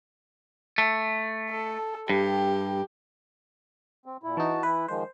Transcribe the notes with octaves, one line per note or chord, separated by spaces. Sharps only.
A3
A4
G2 G4
C4
A#2 E4
E3 D#4 F#4 A5
E3 E4 B4
D#3 F3 G#3 C5